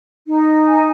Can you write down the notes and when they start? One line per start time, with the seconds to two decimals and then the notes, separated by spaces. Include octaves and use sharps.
0.28 D#4
0.65 G#5